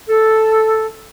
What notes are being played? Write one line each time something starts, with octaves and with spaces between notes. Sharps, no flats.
A4